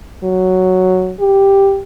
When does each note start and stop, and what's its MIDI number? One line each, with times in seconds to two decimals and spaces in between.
0.24 1.14 54
1.20 1.81 67